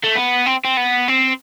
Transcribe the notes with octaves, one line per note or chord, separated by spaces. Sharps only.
A3
B3
C4
C4
B3
C4